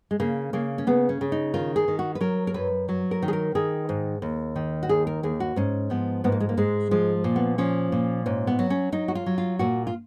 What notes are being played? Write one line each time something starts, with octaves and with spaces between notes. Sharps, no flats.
G#3
C#3 A#3
C#3 A#3
C#4
C#3 B3
C#4
C#3
D#4
D#3 F4
G#4
D#3
F#4
B4
F#3 A#4
A#4
F#2 B4
F#3
A#4
D#3
G#4
A#4
D#3 G#4
G#2
D#2
D#3
F#4
D#2 G#4
A#4
D#2 G#4
F#4
G#2 C#4
F3 B3
G#2 B3
A#3
G#3
A#3
G#2 G#3
F3 G#3
A#2
B3
F3 C#4
A#2
G#2 C#4
B3
F#3
C#4
F#3 D#4
F#4
F4
F#3
F4
A#2 F#4
F4